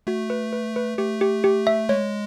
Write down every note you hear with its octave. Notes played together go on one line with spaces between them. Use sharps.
A3 F#4
B4
B4
B4
A3 G4
G4
G4
E5
G#3 C#5